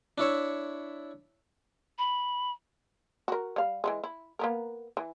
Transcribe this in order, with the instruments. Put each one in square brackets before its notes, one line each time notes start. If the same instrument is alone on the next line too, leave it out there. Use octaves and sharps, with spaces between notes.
[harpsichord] D4 E4 C#5 E5
[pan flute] B5
[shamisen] F#4 A#4
G3 F5
E3 G3 G#3
E4
A#3 B3 A#4
E3